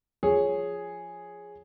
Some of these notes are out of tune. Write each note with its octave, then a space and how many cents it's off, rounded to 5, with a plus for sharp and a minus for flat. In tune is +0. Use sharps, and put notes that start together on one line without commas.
F3 +0 G#4 +0 C#5 +0